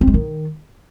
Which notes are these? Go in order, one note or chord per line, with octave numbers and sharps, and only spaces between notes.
C4
G#3
D#3